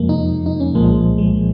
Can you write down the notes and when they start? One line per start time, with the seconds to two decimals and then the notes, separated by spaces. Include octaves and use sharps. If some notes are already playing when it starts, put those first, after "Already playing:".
Already playing: F2 C3 F3 G#3 A#3
0.09 D#4
0.46 D#4
0.60 C#4
0.74 C2 A#2 F3 G#3 A#3
1.18 G#3